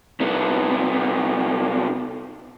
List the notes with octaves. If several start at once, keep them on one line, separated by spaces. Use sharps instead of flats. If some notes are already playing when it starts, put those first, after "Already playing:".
C2 B3